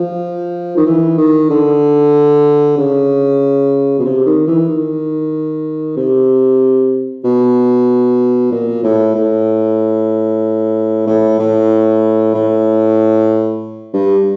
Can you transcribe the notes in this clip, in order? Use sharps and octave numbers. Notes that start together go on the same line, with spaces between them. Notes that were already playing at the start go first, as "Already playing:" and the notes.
Already playing: F3
D#3
E3
D#3
D3
C#3
B2
C3
D#3
E3
D#3
C3
B2
A#2
A2
A2
A2
A2
A2
G2